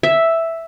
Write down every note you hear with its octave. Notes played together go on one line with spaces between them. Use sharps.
E5